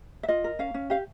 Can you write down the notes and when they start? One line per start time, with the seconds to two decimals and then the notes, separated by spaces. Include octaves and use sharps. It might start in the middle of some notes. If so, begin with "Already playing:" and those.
0.23 E5
0.28 F4 D#5
0.44 A#4
0.59 C#4 F5
0.74 C#4
0.90 G4 F5